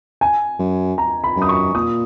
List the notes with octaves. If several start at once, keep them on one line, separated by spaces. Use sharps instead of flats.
G#5
F#2
A#5
B5
F#2
D#6
C#6
A#2 D#6